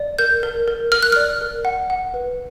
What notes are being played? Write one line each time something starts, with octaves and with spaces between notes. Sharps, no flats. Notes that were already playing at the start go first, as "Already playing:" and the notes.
Already playing: D5
A#4 G6
A#4
A#4
A#4 F6
F#6
D5 F6
A#4
F#5
F#5
B4